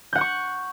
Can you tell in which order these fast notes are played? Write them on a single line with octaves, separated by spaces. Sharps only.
G6 F#5 F#6 C#6